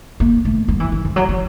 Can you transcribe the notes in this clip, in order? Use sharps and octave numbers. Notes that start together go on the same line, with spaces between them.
A#3
A3
G3
E3
E3
F3
F#3
F3